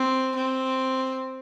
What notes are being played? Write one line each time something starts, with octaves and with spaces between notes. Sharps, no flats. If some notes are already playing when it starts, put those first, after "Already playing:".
Already playing: C4
C4